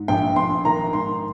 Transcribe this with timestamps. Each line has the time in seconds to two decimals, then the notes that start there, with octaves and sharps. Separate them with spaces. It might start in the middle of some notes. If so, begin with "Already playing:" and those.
Already playing: G#2
0.08 A#1 G5
0.36 A#1 C6
0.65 D#3 A#5
0.93 G#2 C6